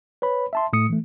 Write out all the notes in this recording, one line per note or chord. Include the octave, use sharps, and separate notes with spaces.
B4 C#5 B5
E5 A5 C6
A2 A3 D#6 C#7
E3 A3